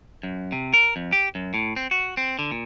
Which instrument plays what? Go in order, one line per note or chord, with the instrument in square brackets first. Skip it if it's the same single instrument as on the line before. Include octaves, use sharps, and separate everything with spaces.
[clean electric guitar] F#2
C3
A#4
F2
G4
F#2
A2
C4
F#4
C4
D3
A#2